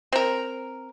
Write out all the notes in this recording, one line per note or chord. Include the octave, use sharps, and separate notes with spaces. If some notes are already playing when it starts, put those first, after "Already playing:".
C4 A#4